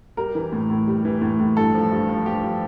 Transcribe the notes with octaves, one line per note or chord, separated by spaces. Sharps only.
G3 A#4
E3
A2
A2
G3
E3
A2
A2
G2 A4
F3
G2
F3
G2 G4
F3